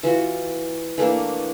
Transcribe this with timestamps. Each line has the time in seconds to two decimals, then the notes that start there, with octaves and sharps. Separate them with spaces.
0.03 E3 F4 F#4
0.98 E3 A3 A#3 D4